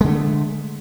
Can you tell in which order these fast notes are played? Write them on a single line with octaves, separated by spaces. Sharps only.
G#3 D3 A3